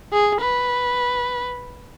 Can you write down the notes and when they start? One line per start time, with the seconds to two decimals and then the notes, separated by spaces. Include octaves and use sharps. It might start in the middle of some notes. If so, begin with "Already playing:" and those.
0.13 G#4
0.41 B4